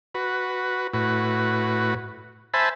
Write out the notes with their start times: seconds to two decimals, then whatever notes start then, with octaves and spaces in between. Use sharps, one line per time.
0.15 F#4 B4
0.94 A2 F#4 B4
2.54 C5 E5 G#5 A5 B5